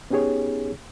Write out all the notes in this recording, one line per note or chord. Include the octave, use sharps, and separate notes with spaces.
B3 C#4 D#4 G4 G#4 C#5